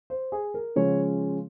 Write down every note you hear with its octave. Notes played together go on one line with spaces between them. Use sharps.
C5
G#4
A#4
C#3 F3 G#3 C#4 C#5